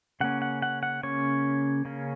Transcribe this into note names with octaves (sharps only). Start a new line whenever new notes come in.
C#3 A#3 C#4 F#5
F#5
F#5
F#5
C#3 A#3 C#4 C#5
C#3 A#3 C#4